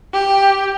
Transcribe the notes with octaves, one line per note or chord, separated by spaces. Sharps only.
G4